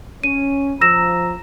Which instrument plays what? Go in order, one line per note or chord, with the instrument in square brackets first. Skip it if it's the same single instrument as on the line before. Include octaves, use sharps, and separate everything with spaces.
[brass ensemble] C#4 [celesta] D#7
[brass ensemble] F3 A#5 [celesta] E6 A#6 E7